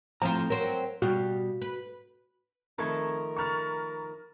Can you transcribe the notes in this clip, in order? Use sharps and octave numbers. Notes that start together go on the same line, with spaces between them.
F2 A2 F3 F4 A#5
F#3 C4 A#4
B2 G3 F#4 F5
B4
D#3 F3 A3 C4 A#4 B5 C#6 G#6
A#5 B5 C#6 F6 A6